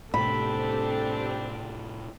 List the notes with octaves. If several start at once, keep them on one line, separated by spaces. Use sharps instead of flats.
A2 C3 C4 D4 G4 A4 B5